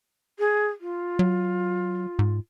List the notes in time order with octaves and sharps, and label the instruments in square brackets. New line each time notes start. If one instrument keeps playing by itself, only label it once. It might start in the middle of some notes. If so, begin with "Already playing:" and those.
[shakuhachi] G#4
F4
[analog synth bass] F#3
G#2